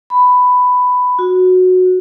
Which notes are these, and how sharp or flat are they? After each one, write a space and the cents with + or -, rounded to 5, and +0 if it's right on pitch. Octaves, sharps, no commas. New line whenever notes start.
B5 +10
F#4 -10